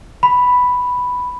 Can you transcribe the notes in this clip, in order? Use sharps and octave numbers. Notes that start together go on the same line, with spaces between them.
B5